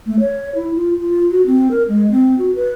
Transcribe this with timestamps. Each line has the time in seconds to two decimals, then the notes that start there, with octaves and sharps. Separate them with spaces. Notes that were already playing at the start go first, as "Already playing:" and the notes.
0.06 A3
0.20 C#5
0.55 E4
0.75 F4
1.00 F4
1.31 F#4
1.46 C4
1.71 A#4
1.88 G#3
2.11 C4
2.38 F#4
2.55 B4